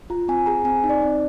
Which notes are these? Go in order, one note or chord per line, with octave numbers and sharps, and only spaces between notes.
F4 A#5
C4 G#5
G#4 A#5
C4 G#5
D#4
D5
C4